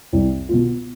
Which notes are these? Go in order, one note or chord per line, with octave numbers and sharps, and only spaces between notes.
C2
B2 B3 F4